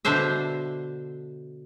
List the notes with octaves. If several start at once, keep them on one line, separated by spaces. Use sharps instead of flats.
B2 D3 D4 C5 E5